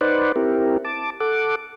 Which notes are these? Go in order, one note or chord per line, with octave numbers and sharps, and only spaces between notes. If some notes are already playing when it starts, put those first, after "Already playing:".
D#4 B4 C5 D5 F#5
C4 E4 G4 A#4
A5 D6
A4 F#5 D6